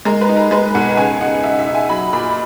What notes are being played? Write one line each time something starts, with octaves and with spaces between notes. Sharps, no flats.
G#3 A#4
B4
D#4
A#4
G#3 B4
B1 F#5
C#2 G#5
D#4 F#5
D#4 E5
E5
D#4
G#5
F#3 B5
A#2 B5